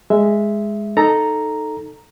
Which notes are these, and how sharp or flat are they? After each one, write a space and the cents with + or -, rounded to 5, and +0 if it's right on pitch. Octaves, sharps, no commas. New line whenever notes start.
G#3 +0 E5 +0
D#4 -10 A4 +0 A#5 +0